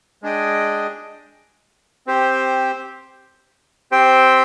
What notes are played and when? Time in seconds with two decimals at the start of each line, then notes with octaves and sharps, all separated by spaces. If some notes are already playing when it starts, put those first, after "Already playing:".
0.22 G#3 D4 G#4 D#5 G5
2.07 C4 G4 C5
3.92 C4 G4 C5 G5